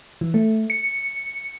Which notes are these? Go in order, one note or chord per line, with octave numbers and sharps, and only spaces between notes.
E3
A3
C#7